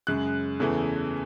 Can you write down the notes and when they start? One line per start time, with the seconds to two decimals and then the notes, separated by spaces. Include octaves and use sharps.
0.07 F#2 C#3 G#3 F#6
0.59 E2 C#3 E3 A3